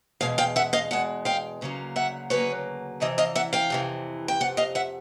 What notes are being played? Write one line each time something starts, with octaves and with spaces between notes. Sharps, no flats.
E2 B2 G#3 F5
F5 G5
E5 F#5
D#5 F5
E2 B2 G#3 F#5
F5 G5
D2 C#3 F#3 A#3
E5 F#5
D2 C#3 F#3 A#3 B4 C#5
F2 C3 E3 D#5
D#5 F5
E5 F#5
F5 G5
F2 C3 E3
G5
F2 C3 F#5
D#5 F5
E5 F#5